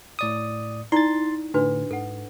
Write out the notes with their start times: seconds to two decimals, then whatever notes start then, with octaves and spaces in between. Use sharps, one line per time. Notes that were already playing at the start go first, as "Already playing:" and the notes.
0.19 A2 D5 D#6
0.92 D#4 E4 D5 C6 A6
1.54 A2 D3 D4 F#4 B4
1.91 G#2 A4 F#5